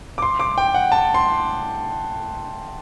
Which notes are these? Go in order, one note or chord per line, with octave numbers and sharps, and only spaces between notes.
D6
C6
D6
G5
F#5
A5
C6